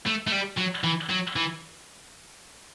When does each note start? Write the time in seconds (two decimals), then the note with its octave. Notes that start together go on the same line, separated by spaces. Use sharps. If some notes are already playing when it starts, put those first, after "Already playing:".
0.06 A3
0.27 A3
0.32 G3
0.58 F#3
0.84 E3
1.09 F#3
1.36 E3